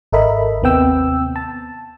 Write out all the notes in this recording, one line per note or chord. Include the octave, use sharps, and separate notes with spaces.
G#1 A4 A#4 D#5 E5 B5
D#2 C3 B3 C4 G5 E6
A5